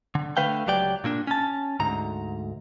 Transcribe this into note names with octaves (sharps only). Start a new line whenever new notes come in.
D3
D3 A3 B4 F5 G5
C#2 F#3 G4 D5 G5
A#2 A#3 C#4 D4
C#4 A5
D2 G#2 A#5